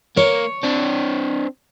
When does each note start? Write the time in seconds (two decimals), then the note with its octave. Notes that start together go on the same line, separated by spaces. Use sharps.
0.17 A#3 C#5
0.64 C4 D4